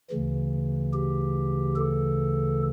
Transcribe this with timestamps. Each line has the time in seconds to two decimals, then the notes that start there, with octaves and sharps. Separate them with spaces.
0.10 D2 C#3 E3
0.93 G4
1.76 A4